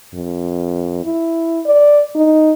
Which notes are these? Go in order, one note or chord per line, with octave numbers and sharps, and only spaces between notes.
F2
E4
D5
D#4